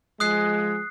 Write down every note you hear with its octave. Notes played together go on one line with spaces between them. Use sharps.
F3 G#3 D#6 F#6 C7